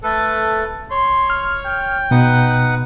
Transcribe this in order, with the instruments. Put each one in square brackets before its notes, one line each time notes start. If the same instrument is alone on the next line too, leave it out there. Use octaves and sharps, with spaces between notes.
[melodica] A3 B4 [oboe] A4
[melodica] C#5 [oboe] C6
[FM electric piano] F6
[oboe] G5
[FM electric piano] B2 [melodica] D#4 B4 F#5